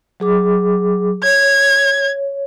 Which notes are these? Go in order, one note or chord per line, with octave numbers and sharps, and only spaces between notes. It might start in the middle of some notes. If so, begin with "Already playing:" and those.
F#3 G#4 D6
C#5 G#6